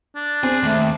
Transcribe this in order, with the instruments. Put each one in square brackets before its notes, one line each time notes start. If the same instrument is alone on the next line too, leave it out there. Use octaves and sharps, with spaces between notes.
[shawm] D4
[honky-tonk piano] C4 [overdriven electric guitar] G#4
[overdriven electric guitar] D#2 [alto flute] A3